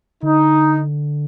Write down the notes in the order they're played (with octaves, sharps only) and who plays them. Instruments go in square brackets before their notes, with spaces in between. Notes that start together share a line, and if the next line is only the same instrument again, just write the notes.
[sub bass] D3 [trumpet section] D#4